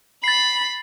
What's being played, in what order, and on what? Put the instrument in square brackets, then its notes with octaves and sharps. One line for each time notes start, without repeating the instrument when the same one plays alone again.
[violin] B5 [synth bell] A6 C7